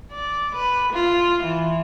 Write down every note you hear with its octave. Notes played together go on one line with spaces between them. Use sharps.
D5
B4
F4
E3